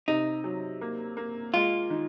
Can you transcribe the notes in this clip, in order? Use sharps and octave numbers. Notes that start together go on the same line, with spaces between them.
C3 D#4
F#3
A#3
A#3
G#3 F4
D#3